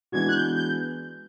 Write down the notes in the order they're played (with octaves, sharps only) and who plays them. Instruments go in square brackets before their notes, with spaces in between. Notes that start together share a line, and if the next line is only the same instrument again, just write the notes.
[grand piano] E3 G#3 B3 D4 F#4 [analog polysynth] G#6
[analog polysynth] F#6
G6
G6